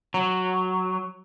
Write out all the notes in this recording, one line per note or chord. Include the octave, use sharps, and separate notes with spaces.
F#3